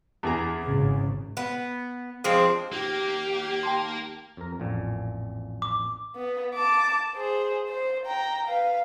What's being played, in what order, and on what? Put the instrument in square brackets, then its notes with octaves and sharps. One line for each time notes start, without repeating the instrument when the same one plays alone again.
[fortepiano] E2 G#4 A#5
[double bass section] G#1 C#3
[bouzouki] B3
F3 G#3 C4 D4
[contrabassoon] D#2 [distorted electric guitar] A#3 [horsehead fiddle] G4
[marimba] G5 A5 C6
[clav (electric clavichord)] F2 A#4
A1 F2 A#2
[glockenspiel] D6
[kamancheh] B3
A5 D6
G#4 C5
C5
G5 A#5
B4 F5